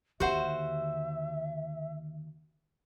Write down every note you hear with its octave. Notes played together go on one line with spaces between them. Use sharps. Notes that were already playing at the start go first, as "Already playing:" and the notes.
D#2 D3 F#4 G4 C5 E5 F#5